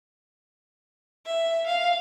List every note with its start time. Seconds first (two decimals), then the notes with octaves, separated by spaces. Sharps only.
1.26 E5
1.66 F5